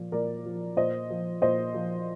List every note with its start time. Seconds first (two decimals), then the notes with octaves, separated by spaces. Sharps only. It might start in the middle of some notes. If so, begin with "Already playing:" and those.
Already playing: A#2 F3
0.12 A#2 A#4 D5
0.46 F3
0.77 A#2 C5 D#5
1.10 F3
1.42 A#2 C5 D#5
1.74 F3